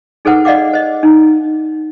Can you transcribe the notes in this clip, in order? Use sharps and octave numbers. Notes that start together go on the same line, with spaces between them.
D#4 G#4 A4 B4 C5 F#5
D5 D#5 F5 F#5 D6
C5 D#5
D#4